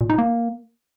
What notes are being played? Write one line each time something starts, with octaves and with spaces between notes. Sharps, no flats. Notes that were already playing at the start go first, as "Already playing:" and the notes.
A#2
D#4
A#3